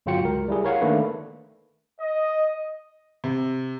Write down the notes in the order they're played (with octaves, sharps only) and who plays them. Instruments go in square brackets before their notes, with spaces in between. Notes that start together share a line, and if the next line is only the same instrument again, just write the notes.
[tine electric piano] G1 F#3 F4 F#4 G5 C#7
C#2 A#4
G3 E4 G#4
A#4 C#5 F5 F#5
D#3 A3 A#3 D4 B4
[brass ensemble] D#5
[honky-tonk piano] C3